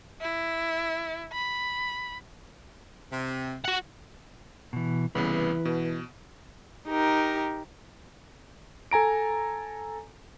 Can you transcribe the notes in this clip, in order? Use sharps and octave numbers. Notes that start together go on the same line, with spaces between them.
E4
B5
C3
F#4 F#5
B2 E3
C2 C#3 E3 B3 B4
B2
D#4 G4 A#4
A4 G#5 A#5 D7